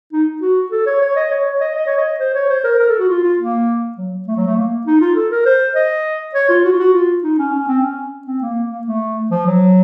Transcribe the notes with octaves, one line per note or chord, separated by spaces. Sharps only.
D#4
F#4
A4
C#5
C#5
D#5
C#5
C#5
D#5
D#5
C#5
D#5
C5
C#5
C5
A#4
A#4
A4
F#4
F4
F4
A#3
F#3
A3
F#3
A3
A#3
D#4
F4
A4
A#4
C5
D#5
C#5
F4
F#4
F4
F#4
F4
D#4
C#4
C#4
C4
C#4
C4
A#3
A#3
A3
F3
F#3